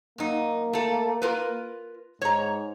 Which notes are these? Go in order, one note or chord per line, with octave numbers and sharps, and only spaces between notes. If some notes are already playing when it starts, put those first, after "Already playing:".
F#2 A#3 D#4
A3 A4
F4 A#4 B4
G#2 C#5 A#5